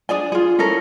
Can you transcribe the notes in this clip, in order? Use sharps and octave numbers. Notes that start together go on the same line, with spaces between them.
D4 G#4 D5 G#5
F4 G#4
C#4 E4 A4 A#4